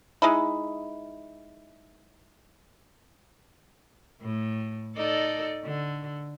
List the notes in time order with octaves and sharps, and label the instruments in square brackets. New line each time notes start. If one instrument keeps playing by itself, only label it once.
[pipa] G#3 D#4 E4
[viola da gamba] A2
D#4 A4 D5
D3